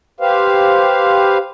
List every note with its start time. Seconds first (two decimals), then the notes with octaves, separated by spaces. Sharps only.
0.21 G4 B4 C5 F5